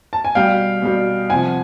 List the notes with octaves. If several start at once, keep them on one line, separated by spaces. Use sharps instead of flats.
A5
G#5
B2 G3 F5 G5
B2 G3
C3 F3 F#5 G#5